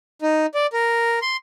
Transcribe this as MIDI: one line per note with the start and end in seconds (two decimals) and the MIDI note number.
0.22 0.46 63
0.54 0.67 74
0.73 1.19 70
1.22 1.37 84